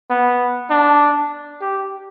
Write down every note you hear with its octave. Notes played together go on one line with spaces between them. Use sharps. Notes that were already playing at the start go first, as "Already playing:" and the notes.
B3
D4
G4